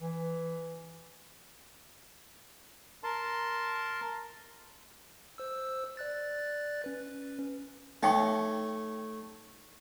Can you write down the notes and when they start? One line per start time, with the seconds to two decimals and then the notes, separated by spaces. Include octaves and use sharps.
0.02 E3
3.04 A#4 A5 C6
5.38 C5 E6
5.97 D5 F#6 A6
6.84 C#4 B4
8.03 A3 D#4 C#5 G5 C#6